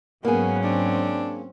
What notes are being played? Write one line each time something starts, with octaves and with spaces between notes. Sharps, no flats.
G#2 F#3 A#3 B3 C#4 G#4
C4 D4